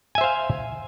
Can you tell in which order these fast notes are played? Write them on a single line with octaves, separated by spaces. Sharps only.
G#5 E5 C5 F5